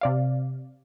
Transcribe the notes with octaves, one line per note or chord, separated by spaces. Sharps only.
C3 D5 F5